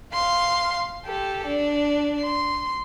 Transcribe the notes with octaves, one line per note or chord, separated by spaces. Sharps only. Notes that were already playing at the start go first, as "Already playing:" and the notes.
F5 C6
G4 A4
D4
C6